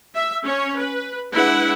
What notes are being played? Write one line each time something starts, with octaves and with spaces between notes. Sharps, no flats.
E5
C#4 C#5
B4
G#3 D4 E4 B4 F#5